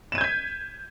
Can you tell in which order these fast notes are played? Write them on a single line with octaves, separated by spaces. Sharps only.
E7 D#7 G#6 G6 B6